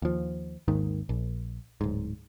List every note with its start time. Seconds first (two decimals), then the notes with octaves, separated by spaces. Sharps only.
0.02 D#2 F3
0.68 G#1 D#2 G#2 D#3
1.09 A#1
1.81 D1 G#2